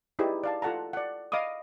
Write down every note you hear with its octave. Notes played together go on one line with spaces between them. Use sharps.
D#4 E4 G4 G#4 B4 D5
D5 F5 A5
F4 A4 F#5 A5 A#5
D5 F#5
D#5 F5 B5 D6 D#6